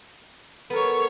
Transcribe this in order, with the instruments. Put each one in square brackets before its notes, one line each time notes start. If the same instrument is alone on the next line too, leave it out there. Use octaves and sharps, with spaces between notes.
[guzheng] B3 A#4 [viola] A4 C#5